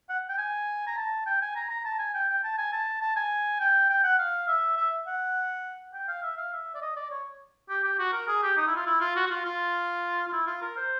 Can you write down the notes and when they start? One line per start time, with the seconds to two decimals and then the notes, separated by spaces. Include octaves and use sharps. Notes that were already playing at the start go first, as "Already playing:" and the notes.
0.09 F#5
0.29 G5
0.38 G#5
0.87 A#5
0.97 A5
1.26 G5
1.42 G#5
1.56 A#5
1.70 A#5
1.85 A5
1.99 G#5
2.14 G5
2.29 G5
2.44 A5
2.58 G#5
2.73 A5
3.02 A5
3.16 G#5
3.60 G5
3.89 G5
4.04 F#5
4.19 F5
4.48 E5
4.77 E5
5.07 F#5
5.94 G5
6.08 F5
6.23 E5
6.38 F5
6.53 E5
6.74 D5
6.82 D#5
6.96 D5
7.11 C#5
7.70 G4
7.84 G4
7.99 F#4
8.13 A#4
8.28 G#4
8.43 G4
8.57 D#4
8.67 E4
8.76 F4
8.87 E4
9.01 F4
9.16 F#4
9.26 F#4
9.30 F4
9.45 F4
10.28 F4
10.33 E4
10.47 F4
10.62 A#4
10.77 C5